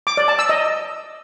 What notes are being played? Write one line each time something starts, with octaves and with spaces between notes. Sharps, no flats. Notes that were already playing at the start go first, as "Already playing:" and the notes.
D6
D5
A5
E6
D#5